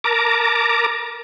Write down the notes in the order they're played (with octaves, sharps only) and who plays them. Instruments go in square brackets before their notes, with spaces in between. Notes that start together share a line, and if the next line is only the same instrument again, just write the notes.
[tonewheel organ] A#4 A5 A#5 D6